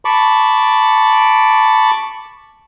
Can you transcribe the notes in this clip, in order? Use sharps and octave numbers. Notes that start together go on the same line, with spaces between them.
A5 B5 C#6 D6